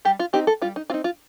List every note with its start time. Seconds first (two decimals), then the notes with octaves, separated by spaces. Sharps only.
0.05 G3 G4
0.19 F4
0.33 C4 D#4 G4
0.47 A4
0.62 G3 F4
0.76 D#4
0.90 C4 D#4 F4
1.04 F4